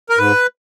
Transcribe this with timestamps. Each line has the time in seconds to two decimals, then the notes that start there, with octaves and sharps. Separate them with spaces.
0.10 A#4
0.18 G#2 B4